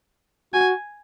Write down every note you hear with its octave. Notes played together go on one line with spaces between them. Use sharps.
F#4 G#5